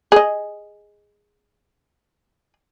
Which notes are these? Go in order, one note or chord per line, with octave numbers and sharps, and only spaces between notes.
G#4 D#5